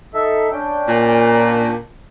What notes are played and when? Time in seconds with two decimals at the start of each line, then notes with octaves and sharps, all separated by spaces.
0.14 D#4 A4 E5
0.52 C#4 D4 G5
0.88 A#2